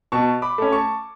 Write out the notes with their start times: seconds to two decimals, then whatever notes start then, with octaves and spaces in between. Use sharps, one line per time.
0.12 B2 A5 C#6
0.42 B5 D6
0.58 A3 C#4
0.72 A5 C#6